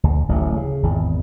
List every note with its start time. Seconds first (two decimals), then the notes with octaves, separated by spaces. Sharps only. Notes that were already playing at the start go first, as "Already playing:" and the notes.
0.03 D2
0.28 D1 A1 D2 A3
0.56 C#3
0.83 G#1 E2